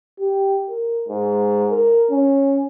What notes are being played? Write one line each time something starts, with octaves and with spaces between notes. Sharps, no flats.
G4
A#4
G#2
A#4
C#4